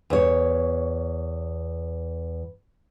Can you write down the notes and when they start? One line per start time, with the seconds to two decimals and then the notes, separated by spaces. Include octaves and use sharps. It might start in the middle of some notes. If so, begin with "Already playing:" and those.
0.10 E2 C#5